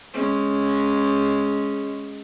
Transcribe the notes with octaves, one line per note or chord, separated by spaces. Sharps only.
G#3 C#4